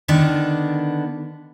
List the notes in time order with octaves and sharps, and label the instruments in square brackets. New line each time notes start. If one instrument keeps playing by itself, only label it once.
[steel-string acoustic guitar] D3 D#3 B3 D4